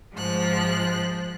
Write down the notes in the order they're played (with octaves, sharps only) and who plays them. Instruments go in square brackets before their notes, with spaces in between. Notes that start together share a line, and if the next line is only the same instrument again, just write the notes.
[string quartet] G#2 F3 F#6